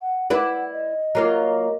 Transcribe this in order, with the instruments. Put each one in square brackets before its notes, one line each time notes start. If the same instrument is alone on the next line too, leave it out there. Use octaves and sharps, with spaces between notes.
[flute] F#5
[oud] E4 B4 D5 [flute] F#5
[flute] D#5
[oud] F#3 A#3 F4